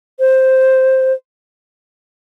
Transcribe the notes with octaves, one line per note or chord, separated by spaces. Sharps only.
C5